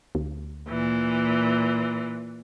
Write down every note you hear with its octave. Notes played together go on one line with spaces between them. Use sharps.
D2
A#2 E3